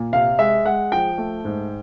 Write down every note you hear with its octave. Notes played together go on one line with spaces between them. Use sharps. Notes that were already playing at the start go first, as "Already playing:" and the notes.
Already playing: A#2
C3 F5
G#3 E5
G#3 F#5
F3 G5
A3
G#2